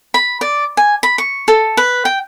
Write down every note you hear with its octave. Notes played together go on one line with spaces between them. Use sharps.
B5
D5
G#5
B5
C#6
A4
B4
G5